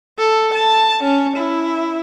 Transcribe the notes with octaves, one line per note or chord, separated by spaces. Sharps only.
A4
A5
C#4
E4